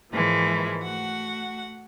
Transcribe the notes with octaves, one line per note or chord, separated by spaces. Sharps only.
G#2 E3 F3 G#3 A#3
A3 F#4 F#5